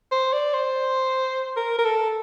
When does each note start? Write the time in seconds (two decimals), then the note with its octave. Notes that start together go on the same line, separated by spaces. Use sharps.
0.11 C5
0.33 D5
0.54 C5
1.57 A#4
1.78 A#4
1.85 A4